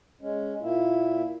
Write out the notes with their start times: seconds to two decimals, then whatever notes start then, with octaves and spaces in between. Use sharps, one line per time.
0.21 G#3 C#4
0.61 A#2 A#3 E4